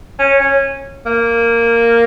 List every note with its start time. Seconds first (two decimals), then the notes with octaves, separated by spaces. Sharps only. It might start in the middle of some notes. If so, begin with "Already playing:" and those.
0.19 C#4
0.41 C#4
1.06 A#3